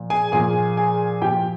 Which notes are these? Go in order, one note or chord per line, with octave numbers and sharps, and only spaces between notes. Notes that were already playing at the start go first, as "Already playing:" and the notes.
Already playing: A#2 F3
G#4 G#5
A#2 F3 G#4 G#5
G#4 G#5
A#2 F3 G4 G5